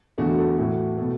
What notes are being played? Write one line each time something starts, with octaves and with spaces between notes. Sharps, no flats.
E2 D3 A3 F#4
A4
A2 E3 A3 F#4
B2 A3